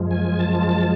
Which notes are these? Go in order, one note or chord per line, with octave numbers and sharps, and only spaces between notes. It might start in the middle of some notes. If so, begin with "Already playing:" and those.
Already playing: F#2 F3 G#3
G#5
A5